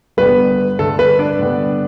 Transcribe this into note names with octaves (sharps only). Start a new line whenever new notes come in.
G1 G2 D3 G3 B3 B4
G2 D3 A3 A4
B4
D4 D5
G2 D3 G3 B3